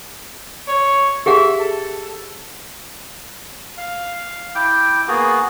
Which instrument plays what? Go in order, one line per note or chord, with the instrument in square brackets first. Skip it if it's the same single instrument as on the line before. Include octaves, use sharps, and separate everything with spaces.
[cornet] C#5
[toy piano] G4 G#4 F#5 [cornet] E5
[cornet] A4
[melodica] F5
E4 G5 D6
A#3 B3 F#4 G#4